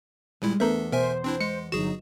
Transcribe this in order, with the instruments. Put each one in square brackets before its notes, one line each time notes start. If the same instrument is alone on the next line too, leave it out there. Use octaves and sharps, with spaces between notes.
[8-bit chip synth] G#1 A#2 E4 [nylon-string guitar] G3 G#3
[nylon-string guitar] E2 [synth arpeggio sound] A3 B3 A#4 [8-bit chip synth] D4 A4 E5
[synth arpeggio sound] B2 [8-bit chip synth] A#4 E5 G#5 [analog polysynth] C5
[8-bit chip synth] C4 D4 E4
[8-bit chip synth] G#3 [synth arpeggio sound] C#7
[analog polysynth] G1 F#3 D#4 [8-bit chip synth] F#4 G#4 [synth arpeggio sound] E7